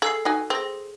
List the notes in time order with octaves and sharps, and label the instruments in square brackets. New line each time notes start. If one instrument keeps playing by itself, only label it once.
[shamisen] G#4 F5 [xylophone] A4 E6 C7
[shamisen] D#4 F#4 G#5
[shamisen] C4 [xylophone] G#4 A#6